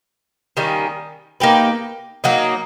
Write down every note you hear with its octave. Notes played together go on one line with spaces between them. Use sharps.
D#3 G3 A#3 C#4
A#3 D#4 G4 B4
F#3 A#3 D#4